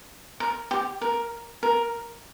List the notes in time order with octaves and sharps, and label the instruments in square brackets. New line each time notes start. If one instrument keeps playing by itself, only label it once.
[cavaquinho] A#4
G4
A#4
A#4